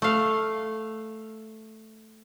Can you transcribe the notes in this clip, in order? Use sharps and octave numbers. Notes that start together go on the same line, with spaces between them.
A3 F5